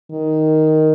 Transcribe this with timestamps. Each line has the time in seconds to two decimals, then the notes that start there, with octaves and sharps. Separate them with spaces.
0.11 D#3